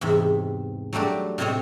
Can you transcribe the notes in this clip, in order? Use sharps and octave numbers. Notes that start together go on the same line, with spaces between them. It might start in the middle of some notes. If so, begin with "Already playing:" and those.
E2 G#2 C3 E5
F#3 G3 A3 D4 G4
A2 C3 C4 C5 C#5 D#5